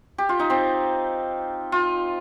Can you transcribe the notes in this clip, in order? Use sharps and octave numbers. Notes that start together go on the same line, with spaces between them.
G4
F4
D#4
C4
F4